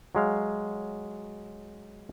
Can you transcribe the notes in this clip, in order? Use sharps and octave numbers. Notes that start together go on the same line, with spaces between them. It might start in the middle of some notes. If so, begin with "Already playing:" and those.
F#3 G#3 F5